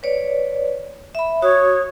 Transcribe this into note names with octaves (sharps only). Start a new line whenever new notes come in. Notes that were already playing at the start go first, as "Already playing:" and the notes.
B4 C#5 D5
E5 B5
F#4 C#5 D#6